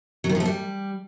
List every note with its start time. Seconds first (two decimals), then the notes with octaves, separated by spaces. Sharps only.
0.24 F#3
0.29 D#3
0.35 F3
0.40 A3
0.45 G3